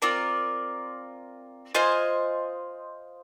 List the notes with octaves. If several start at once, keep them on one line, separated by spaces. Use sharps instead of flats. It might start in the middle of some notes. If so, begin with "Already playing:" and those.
C4 F4 A#4 D5
F4 C5 D#5 G#5